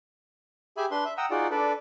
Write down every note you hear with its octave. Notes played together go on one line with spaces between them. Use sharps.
G4 G#4 E5 G#5 B5
D4 B4 C6
E5
F#5 G5 A#5 D#6 E6
D#4 F4 F#4 G#4 D5
D4 A4 B4 D5